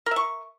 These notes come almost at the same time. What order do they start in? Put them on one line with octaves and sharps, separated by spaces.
A#4 E5 C#6